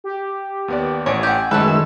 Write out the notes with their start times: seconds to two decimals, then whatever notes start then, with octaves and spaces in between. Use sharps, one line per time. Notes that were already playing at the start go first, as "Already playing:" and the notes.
0.04 G4
0.68 D#2 B3 D5
1.06 A1 C#5 D5 G#5 D7
1.23 G4 F#5
1.51 F#2 D#3 G#3 A3 A4 B4 E6 F#6